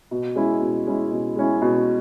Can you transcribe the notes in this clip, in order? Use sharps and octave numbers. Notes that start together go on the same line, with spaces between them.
B2
G#3 C#4 E4
B2
G#3 C#4 E4
B2
G#3 C#4 E4
B2